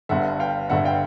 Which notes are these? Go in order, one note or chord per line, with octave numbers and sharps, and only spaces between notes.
G1 G2 D3 E5 F#5
F5 G5
G1 G2 D3 E5 F#5
F5 G5